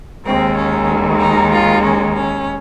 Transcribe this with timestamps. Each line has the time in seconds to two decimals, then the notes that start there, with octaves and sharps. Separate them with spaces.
0.25 D#2 D#3 G#3 C4
0.56 C#4
1.19 D#4
1.50 F4
1.82 C#4
2.14 C#4